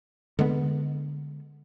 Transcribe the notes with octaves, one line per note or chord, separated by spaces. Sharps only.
D3 G#3 B3